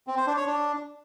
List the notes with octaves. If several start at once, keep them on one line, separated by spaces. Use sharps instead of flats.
C4
C5
D4
C#5
D4